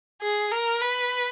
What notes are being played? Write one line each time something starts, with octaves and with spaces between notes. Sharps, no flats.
G#4
A#4
B4